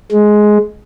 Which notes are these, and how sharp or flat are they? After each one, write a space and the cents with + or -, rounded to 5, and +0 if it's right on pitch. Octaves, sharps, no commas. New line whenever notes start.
G#3 +10